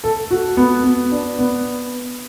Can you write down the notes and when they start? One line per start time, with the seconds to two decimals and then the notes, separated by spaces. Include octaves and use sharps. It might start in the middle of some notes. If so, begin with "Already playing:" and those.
0.04 A4
0.31 F#4
0.57 B3
0.84 B3
1.12 D4
1.39 B3